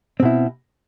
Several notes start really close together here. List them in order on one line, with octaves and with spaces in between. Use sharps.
C4 B2 E4